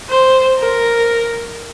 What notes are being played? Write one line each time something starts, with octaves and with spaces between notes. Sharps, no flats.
C5
A#4